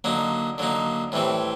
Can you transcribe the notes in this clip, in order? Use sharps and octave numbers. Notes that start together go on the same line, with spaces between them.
D3 F#3 A#3 D#4
D3 F#3 A#3 D#4
A2 E3 G3 C4